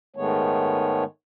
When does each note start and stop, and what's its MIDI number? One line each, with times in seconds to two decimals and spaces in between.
0.16 1.04 44
0.16 1.04 51
0.16 1.04 56
0.16 1.04 57
0.16 1.04 59
0.16 1.04 73